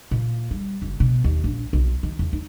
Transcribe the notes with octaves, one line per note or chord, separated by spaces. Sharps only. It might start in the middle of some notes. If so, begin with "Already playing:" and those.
A#2
G3
F#1
B2
D#2
A#1
B1
D#3
E2
D#4